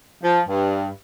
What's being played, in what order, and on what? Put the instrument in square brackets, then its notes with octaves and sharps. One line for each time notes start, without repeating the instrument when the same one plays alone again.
[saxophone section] F3
G2